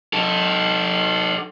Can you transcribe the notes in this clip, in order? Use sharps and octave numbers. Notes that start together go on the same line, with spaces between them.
D#4 A4